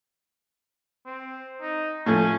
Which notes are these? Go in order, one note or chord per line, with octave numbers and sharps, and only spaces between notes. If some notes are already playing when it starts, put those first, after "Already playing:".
C4
D#4
A2 F3 A3 C#4